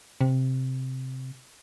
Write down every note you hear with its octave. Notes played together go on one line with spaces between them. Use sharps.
C3